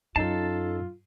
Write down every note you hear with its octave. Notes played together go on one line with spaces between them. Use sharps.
F#2 C#4 D#4 F4 A4 A5 C7